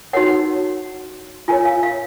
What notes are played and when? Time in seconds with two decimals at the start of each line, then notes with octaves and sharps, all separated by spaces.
0.13 D#4 F#4 A#4 C#5 F#5
1.48 F4 A#4 C#5 G#5
1.65 F5
1.83 F5